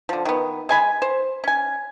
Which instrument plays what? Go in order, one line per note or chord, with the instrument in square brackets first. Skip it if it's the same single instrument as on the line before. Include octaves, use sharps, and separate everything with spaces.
[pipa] D3 F3
D#3 B3
G#3 G#5 B5
C5
C#4 G#5